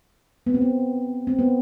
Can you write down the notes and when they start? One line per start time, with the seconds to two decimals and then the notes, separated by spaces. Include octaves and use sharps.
0.46 B3
0.54 C4
0.61 B3
1.27 C4
1.39 B3